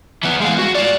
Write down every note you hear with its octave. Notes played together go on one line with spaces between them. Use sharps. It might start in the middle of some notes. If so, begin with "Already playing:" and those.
E3 B3
G#3 F5
F#4
F4 D5